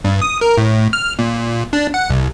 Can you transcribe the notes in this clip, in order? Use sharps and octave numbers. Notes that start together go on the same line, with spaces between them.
G2
D#6
A#4
A2
F6
A#2
D4
F#5
C2